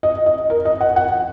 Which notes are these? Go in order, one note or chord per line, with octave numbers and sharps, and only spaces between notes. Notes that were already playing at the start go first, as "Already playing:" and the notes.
D#5
D#5
A#4
D#5
F#5
F#5